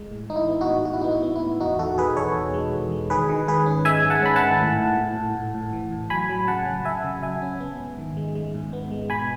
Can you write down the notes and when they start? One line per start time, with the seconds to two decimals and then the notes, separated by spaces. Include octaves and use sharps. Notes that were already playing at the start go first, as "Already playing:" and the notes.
Already playing: G#3
0.11 A2
0.29 E3 D#4
0.36 E4
0.48 B3
0.61 D#4 F#4
0.67 A2
0.85 A2 F#4
0.93 E4
1.01 B3 D#4 F#4
1.11 E4
1.23 B3
1.36 E4
1.42 A2
1.60 E2 D#4 F#4
1.79 E2 F#4 A4
1.97 B2 G#4 B4
2.16 E2 A4 C#5
2.35 B2
2.54 G#3
2.73 E2
2.92 G#3
3.10 D#3 G#4 B4
3.29 D#3
3.48 G#2 G#4 B4
3.66 C#4
3.85 G#3 E5 G#5
4.04 G#2
4.10 F#5 A5
4.23 C#4 B5
4.36 F#5 A5
4.42 D#3
4.60 A2
4.80 A2
4.98 A2
5.16 A2
5.35 A2
5.55 A2
5.73 E3
5.91 A2
6.10 F#3 G#5 B5
6.29 F#3
6.48 C#3 F#5 A5
6.66 F#3
6.85 C#3 E5 G#5
7.04 C#3
7.23 F#3 E5 G#5
7.42 C#4
7.60 B3
7.80 G#2
7.98 D#3
8.17 G#3
8.35 G#3
8.54 G#2
8.73 B3
8.91 G#3
9.10 B2 G#5 B5